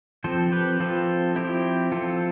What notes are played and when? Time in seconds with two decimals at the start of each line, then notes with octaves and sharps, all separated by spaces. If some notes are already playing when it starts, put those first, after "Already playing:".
0.24 F3 C4 A4 C5
0.52 G4 B4
0.80 F3 C4 F4 A4
1.36 F3 C4 E4 G4
1.92 F3 C4 F4 A4